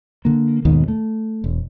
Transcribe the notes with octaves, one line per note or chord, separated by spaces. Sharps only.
D3 A#3
D#2 G#2 B2 D#3
A3
E1